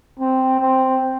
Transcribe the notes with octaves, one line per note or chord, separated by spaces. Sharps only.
C4
C4